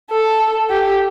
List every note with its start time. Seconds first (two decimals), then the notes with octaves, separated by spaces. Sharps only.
0.11 A4
0.70 G4